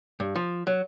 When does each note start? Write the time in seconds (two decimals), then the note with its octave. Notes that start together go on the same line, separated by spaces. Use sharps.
0.20 G2
0.35 F3
0.67 F#3